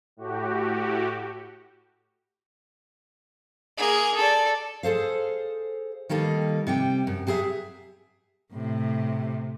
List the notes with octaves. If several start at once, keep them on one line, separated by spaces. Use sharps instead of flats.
A2 F#4 G4
A#3 G#4
A4 D5
G#4 A4 C5 F5
D#3 G3 A#3 D#4 A4
C3 G3 G5
F#2
F#3 G4 G#4 A#4 E5
A2 C3